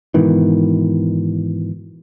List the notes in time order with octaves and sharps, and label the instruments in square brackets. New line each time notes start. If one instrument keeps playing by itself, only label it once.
[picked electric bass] G#2 B2 D#3 E3